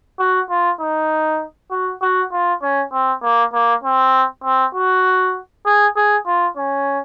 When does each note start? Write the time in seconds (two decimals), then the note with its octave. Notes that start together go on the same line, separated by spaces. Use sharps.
0.20 F#4
0.50 F4
0.80 D#4
1.71 F#4
2.02 F#4
2.32 F4
2.62 C#4
2.92 C4
3.23 A#3
3.53 A#3
3.84 C4
4.44 C4
4.75 F#4
5.66 G#4
5.96 G#4
6.26 F4
6.57 C#4